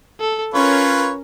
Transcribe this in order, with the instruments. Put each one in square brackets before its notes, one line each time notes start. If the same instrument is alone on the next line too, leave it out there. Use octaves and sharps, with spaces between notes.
[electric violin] A4
[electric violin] C#4 A#4 [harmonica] F4 B4 C#5